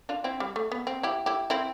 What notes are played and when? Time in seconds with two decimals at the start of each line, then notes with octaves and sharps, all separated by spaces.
0.09 D4 F4
0.24 C4 E4
0.40 G3
0.56 A3
0.72 B3
0.87 C4
1.03 E4 G4
1.26 E4 G4
1.50 C4 E4